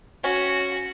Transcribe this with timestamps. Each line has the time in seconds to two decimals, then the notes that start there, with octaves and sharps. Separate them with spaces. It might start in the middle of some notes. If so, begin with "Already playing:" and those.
0.24 C#4 F#4